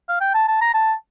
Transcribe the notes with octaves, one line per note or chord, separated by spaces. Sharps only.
F5
G5
A5
A5
A#5
A5